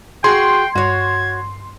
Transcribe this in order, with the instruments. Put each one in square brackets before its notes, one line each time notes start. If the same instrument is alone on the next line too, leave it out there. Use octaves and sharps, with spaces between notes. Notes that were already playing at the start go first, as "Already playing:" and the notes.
[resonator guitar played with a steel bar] F#4 G#4 [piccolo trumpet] G5 [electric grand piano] C6
[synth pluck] G2 [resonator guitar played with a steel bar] F#4 C#5 [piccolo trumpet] G#6